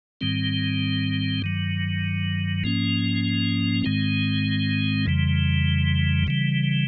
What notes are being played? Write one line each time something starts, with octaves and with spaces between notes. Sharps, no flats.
G#2 D#3 G3 C4
G2 D#3 F#3
G#2 F3 A#3 C#4
G#2 D#3 G#3 C4
F2 C#3 E3 G3
C#3 E3 G3